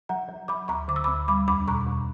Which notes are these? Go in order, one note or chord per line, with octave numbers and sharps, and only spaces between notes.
F#3 F#5 A#5
F#3
F#3 B5 D6
D2 A#5 C#6
D3 D6
E6
D2 B5 D6
G3 B5 D6
E2 B5 D6
B2 A#5 C#6
E2